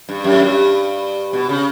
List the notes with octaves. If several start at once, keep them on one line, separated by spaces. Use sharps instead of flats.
G2
F#2
A2
G2
B2
C#3